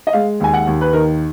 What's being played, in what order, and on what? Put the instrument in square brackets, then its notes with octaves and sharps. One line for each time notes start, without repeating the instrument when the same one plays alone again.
[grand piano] D#5
G#3 F5
D#2 G#5
F#5
D#2
B4
D#3 A#4